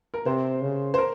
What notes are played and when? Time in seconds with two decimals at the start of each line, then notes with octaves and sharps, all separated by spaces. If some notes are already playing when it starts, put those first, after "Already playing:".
0.14 A#4
0.26 C3 C5
0.61 C#3
0.94 C5
0.98 A#4